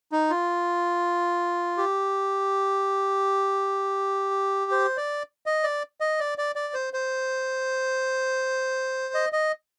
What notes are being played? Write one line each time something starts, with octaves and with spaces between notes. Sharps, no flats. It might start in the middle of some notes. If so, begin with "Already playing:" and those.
D#4
F4
G4
C5
D5
D#5
D5
D#5
D5
D5
D5
C5
C5
D#5
D#5